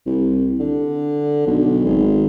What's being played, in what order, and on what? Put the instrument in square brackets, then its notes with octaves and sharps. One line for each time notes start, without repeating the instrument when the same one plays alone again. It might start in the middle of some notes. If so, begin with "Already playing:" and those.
[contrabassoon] C2
D3
B1
G#1